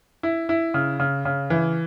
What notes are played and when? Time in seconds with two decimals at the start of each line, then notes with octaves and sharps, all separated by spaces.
0.23 E4
0.49 E4
0.74 C#3
1.00 C#3
1.25 C#3
1.50 E3